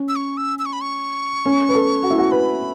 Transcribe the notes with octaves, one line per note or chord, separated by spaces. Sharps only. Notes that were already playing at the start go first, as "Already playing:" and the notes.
Already playing: C#4
E6
C#6
E6
E6
C#6
B5
C#6
C#4
B4
A4
F#4
E4
F#4
B4 B5